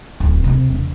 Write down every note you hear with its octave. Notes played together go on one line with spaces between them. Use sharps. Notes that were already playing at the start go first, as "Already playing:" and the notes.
D1
C3
E1